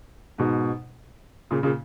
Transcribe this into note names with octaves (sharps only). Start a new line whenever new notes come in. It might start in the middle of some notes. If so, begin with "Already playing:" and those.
G#2 B2
A#2 C#3
A#2 C#3